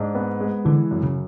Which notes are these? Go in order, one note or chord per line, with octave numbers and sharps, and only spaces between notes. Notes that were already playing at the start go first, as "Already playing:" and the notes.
Already playing: G#2 D4
B3
G#3
D3 E3
F#2
C#3